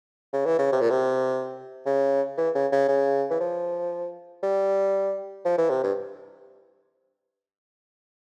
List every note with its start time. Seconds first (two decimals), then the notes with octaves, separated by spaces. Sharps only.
0.33 C#3
0.46 E3
0.59 C#3
0.72 C3
0.81 A#2
0.90 C3
1.86 C#3
2.38 E3
2.55 C#3
2.72 C#3
2.88 C#3
3.30 E3
3.40 F3
4.43 G3
5.45 F3
5.58 E3
5.70 C3
5.83 G2